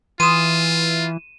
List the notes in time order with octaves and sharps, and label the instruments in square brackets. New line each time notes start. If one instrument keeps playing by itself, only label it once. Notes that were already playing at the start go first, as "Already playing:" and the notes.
[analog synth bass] E3 [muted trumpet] F4 [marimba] C6 D#6 [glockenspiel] D#7 E7